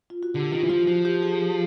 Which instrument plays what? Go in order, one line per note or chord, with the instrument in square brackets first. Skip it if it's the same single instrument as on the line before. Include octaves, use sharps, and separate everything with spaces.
[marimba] F4
F#4
[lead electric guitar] D3 [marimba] G4
[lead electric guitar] D#3 [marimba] F4
[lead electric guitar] E3
[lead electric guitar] F3 [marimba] F4
[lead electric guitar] F3 [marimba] F#4
[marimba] G4
G#4
G4